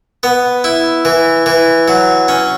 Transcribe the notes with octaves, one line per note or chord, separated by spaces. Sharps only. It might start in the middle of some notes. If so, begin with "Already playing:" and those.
B3
E4
E3
E3
F#3
C#4